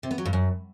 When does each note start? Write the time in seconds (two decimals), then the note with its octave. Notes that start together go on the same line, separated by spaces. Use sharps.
0.03 C3
0.11 B3
0.18 F#3
0.25 G2
0.33 F#2